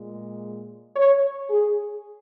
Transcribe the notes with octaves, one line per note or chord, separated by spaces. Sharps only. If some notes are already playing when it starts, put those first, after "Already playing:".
Already playing: A#2 G#3
C#5
G#4